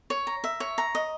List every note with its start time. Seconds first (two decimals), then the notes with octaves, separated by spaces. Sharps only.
0.10 C#5
0.27 A#5
0.44 E5
0.60 C#5
0.78 A#5
0.95 D#5